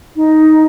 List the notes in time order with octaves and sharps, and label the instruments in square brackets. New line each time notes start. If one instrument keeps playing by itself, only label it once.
[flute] D#4